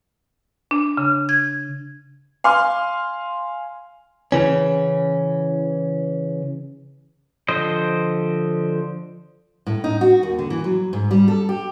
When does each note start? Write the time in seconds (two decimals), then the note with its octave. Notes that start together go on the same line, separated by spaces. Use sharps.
0.71 D4
0.97 C#3
1.29 G#6
2.44 F5 G#5 C6 F6
4.32 C#3 E3 C#4
7.48 D3 F3 C5 D#5
9.67 A2
9.84 D#4
10.01 F#4
10.23 D#2
10.39 D3
10.50 E3
10.64 F#3
10.93 G#2
11.11 G3
11.28 A4
11.49 G4